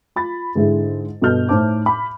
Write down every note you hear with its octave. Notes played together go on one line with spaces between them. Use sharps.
F4 B5 A6
G#2 D3 G#3 E4 G#4
G2 B2 A4 D#5 F6 G6
A2 D#4 C5 A5 D6
B5 D6